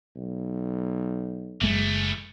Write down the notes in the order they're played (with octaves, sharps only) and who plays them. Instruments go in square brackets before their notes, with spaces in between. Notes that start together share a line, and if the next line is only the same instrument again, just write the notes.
[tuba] B1
[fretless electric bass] F#1 G#3 [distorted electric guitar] E3 A3